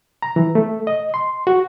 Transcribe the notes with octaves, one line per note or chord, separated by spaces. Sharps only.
A#5
E3
A3
D#5
C6
F#4